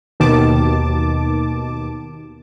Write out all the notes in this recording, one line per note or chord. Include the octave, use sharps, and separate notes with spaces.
D#2 B2 D#3 A5 D6